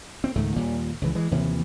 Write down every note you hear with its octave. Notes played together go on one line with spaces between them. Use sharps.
C4
C#2 G#2 D#3 A3
D#2 A#2 G3
C#2 E3
E3 G#3
D#2 C3 E3 F3